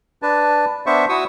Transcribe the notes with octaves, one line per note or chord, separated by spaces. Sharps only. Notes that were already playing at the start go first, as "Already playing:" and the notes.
D4 B4 A5
B3 D4 C5 E5 C#6
E4 F#4 C#6 D#6 E6